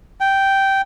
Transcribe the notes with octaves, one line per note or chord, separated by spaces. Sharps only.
G5